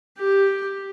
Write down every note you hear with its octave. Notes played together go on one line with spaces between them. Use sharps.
G4